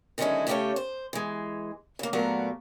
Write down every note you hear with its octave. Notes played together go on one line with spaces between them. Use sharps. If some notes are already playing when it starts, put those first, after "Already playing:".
D3 D#3 F#3 G#3 C#4 E4
C#3 A3 C#4 G4 A4 C#5
C5
E3 G#3
C#3 A#3
A#2 F#3 A3 B3 F#4 A#4